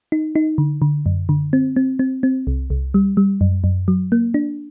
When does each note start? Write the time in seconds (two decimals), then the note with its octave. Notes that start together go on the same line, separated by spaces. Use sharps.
0.12 D#4
0.35 D#4
0.58 D3
0.82 D3
1.06 F#2
1.29 D3
1.53 C4
1.76 C4
1.99 C4
2.23 C4
2.47 C2
2.70 C2
2.94 G3
3.17 G3
3.41 F#2
3.64 F#2
3.88 F#3
4.12 A#3
4.34 D4